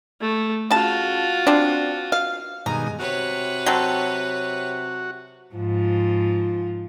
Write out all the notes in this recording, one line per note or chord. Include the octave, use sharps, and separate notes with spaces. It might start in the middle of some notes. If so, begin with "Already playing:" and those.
A3
C#3 F4 F#4 A5
C4 D4
F5
G2 B2 D#3 G#3 G#5 A#5
C3 F#4 B4 C#5
F#3 C4 A4
G#2 F3